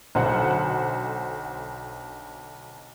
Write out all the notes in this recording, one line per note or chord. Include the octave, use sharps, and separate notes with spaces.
B1 D3 C5 F#5